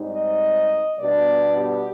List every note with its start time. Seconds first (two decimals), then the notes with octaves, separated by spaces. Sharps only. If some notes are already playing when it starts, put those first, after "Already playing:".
Already playing: G#2 G3 C4 D#4
0.13 D#5
0.99 B2 G3 B3 D4 D5
1.57 G4